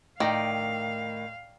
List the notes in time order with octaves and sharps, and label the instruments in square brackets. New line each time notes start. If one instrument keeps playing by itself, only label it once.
[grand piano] A2 [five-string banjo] D#3 [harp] D5 G5 A#5 [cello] F5